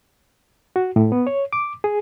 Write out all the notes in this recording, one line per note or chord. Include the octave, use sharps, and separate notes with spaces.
F#4
A2
B3
C#5
D6
G#4